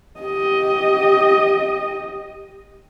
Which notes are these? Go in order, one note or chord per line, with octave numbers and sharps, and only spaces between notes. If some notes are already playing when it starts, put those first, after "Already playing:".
G4 D#5